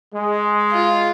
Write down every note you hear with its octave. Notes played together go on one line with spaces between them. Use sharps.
G#3
F4